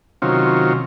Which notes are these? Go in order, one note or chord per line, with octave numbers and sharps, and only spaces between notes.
C3 D#3 F#3 C#4 F4